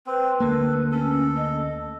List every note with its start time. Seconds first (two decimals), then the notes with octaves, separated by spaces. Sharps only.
0.07 C4 B4
0.40 D2 A#3 A4
0.92 C#4 A4
1.36 D#5